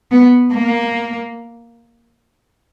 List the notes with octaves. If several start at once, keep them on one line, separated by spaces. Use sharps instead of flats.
B3
A#3